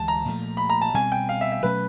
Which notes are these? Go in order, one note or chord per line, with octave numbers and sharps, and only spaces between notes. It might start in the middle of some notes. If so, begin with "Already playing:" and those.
Already playing: D2 E3 G#3 A5
A#5
A#2 F3 A3
B5
A#5
A5
B2 G3 C4 G#5
G5
F5
E5
E5
B2 F#3 A3 C#4 B4